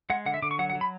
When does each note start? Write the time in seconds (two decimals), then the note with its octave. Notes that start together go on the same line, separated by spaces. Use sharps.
0.10 G#3 F#5
0.26 D3 F#5
0.34 E5
0.42 D3 D6
0.51 C#6
0.59 F#3 F#5
0.70 F#5
0.75 F#3
0.81 B5